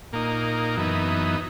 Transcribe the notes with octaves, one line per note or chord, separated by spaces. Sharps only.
A#2 A#3 D#4
F#2 E3 B3 D#4